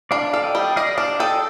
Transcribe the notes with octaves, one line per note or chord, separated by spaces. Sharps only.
D4 D5 F5
A4 F5
D#5 G5
G3
D5 D#5 F5
D4 D5 F5
A4 D#5 G5